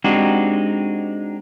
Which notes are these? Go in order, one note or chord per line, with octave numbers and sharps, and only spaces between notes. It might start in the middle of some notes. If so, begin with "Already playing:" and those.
G#3 C4 D4 D#4 F#4 G4